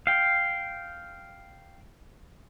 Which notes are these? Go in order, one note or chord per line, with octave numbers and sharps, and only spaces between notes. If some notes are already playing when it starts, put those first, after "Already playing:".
F5 G5